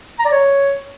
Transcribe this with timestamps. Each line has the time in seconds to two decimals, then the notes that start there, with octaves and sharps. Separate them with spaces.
0.19 A#5
0.25 D5
0.32 C#5